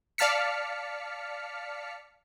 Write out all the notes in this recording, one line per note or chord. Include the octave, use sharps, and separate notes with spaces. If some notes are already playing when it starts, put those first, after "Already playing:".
D5 F5 A5 F6 B6 C#7